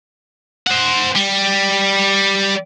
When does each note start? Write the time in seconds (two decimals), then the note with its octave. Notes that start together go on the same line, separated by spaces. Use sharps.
0.67 C5 F#5
1.16 G3